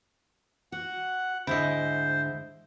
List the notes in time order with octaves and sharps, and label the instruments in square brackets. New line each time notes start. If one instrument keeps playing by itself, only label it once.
[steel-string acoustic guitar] F#4 [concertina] F#5
[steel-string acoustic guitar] D2 G#2 D3 [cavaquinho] E4 D#5 [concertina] C5